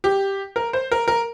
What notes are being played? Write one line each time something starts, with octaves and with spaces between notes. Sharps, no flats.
G4
A#4
C5
A#4
A#4